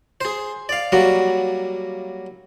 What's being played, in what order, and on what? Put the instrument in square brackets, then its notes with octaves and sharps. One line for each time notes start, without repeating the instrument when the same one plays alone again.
[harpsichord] G#4 C5
D5 F5
F#3 G3 A#3 F#4